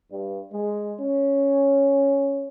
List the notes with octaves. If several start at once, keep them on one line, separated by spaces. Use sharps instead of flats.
G2
G#3
C#4